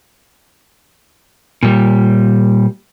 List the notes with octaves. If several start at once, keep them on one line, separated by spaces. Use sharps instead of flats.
A#2 G3